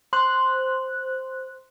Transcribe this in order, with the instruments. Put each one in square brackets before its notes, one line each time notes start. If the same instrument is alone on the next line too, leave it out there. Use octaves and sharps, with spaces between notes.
[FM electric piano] C5 F#6